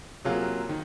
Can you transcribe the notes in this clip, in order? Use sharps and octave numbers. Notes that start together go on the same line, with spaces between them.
C3 F#3 A#3 F4 G#4
D#3